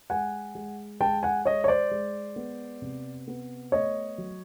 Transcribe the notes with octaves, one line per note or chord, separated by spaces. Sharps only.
G#3 F#5 G#5
G#3
G#3 G5 A5
F#5 G#5
G#3 C#5 D#5
C#5
C5 D5
G#3
B3
C3
B3
A3 C#5 D#5
F#3